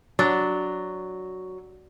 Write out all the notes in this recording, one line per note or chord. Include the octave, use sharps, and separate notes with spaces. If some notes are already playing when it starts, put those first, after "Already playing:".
F#3 D4